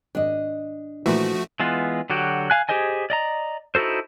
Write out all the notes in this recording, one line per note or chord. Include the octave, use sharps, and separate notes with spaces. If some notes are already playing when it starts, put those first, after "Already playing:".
G#1 D4 D#5
A#2 E3 F3 A3 F#4
E3 G#3 B3 F4
D3 F#3 F#4 G4
F5 G#5 F#6
G4 G#4 C5 D#5 G#5
D5 D#5 A#5
D#4 E4 F#4 A4 C5